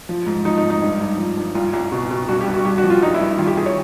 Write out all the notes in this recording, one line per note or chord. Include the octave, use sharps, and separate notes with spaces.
F3
G#2
F3 D#4
D#4
G#2
D#4
G2
G2
F3
G2
C2 F4
C2
B2
B2
G2 F#4
G4
G2
F#4
G2 G4
F#4
F3
F4
G2 D#4
E4
G2
D#3 F4
G4
D#3 G#4
C#5